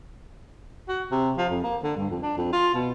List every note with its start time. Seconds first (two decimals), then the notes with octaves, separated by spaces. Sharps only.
0.88 F#4
1.11 C3
1.38 F3
1.49 F2
1.64 A#3
1.83 D3
1.97 G2
2.10 F2
2.22 D4
2.37 F2
2.53 F4
2.74 B2